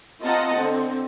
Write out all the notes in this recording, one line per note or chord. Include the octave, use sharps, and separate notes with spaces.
C4 F4 D#5 F#5 A5 A#5
D3 C4